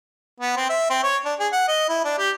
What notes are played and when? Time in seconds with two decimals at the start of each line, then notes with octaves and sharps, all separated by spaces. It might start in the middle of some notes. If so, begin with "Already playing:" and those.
0.40 B3
0.57 C4
0.70 E5
0.90 C4
1.03 C#5
1.25 D4
1.40 G#4
1.53 F#5
1.68 D#5
1.89 E4
2.05 D4
2.19 G4